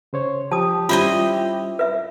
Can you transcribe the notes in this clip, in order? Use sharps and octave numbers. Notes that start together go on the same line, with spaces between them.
C#3 C5 C#5
F3 G4 A5 D#6
G3 C#4 E4 F4 C5 D#5
B4 E5